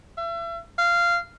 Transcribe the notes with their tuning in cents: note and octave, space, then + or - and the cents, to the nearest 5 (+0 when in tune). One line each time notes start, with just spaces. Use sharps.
E5 +40
F5 -15